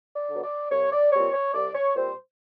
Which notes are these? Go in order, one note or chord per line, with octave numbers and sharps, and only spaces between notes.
D5
D3 F#3 B3
D5
C2 C#5
D5
A#2 G3 C4 C#5
C#5
C2 D5
C#5
A#2 G3 C4 C5